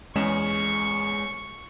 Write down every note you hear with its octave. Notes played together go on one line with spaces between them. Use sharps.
E2 G#3 C#4 C#6 E7